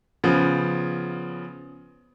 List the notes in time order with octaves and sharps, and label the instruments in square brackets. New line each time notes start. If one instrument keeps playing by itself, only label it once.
[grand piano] C#3 F3 B3